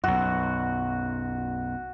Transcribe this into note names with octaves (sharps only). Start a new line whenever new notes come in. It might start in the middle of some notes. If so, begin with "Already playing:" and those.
B1 F#2 F#4